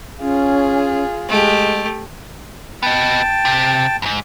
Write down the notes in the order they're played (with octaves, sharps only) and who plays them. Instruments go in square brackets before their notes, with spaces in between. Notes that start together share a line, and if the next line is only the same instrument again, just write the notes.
[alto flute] C#4 [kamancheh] F4 G#4
[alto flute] G#3 [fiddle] A3 G4
[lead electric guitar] B3 D#5 [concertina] G5 A5
[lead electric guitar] C3
F2 G#2